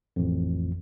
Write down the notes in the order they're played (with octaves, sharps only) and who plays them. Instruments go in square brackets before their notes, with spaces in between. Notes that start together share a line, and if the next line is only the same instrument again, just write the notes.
[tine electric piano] A1 F2